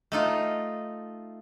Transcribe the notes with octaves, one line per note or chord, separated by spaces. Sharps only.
A3 D#4 F4